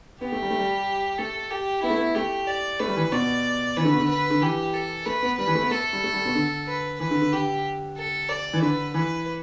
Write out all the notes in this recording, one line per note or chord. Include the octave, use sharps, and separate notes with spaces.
B3 G4
A3
G3
A3
G3
A3 A4
G4
B3 E4
A3
B3
A3 G4
D5
A3 B4
G3
E3
B2 D5
E3 B4
D3
B2
D3
B4
D3
E3 G4
A4
A3 B4
B3
G3 B4
E3
A3
B3
A3 A4
G3
A3
G3
B2
D3
B4
E3 B4
D3
D3
D3 G4
A4
D5
E3
D3 B4
E3 B4